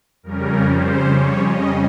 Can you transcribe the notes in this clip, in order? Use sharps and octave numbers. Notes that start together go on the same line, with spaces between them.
F2 C#3 G3 C#4 A#4
C5
C#5
D#5